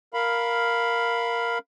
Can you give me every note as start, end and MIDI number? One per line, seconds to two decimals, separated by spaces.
0.14 1.58 70
0.14 1.58 77
0.14 1.58 83